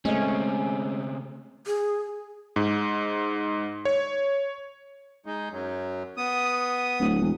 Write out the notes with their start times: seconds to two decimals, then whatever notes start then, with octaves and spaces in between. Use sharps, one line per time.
0.05 C#3 G#3 A3 C4 C#4 D#5
1.67 G#4
2.56 G#2
3.85 C#5
5.26 G#3 D#4
5.51 F#2 F#3
6.17 B3 D#6
6.99 D1
7.21 E1